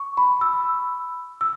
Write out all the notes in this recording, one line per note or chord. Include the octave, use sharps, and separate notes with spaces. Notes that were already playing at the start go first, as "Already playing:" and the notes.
Already playing: C#6
B5
E6
E6